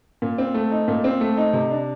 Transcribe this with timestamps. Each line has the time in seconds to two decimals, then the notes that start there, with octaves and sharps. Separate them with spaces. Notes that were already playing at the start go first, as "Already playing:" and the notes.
0.22 A#2
0.38 C4
0.54 A3
0.71 D#4
0.88 A#2
1.04 C4
1.21 A3
1.37 D#4
1.53 C3
1.71 D4